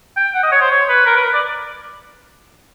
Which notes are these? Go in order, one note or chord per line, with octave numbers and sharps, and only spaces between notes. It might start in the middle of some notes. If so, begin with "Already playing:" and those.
G5
F#5
D#5
C#5
C5
C#5
B4
A#4
B4
D5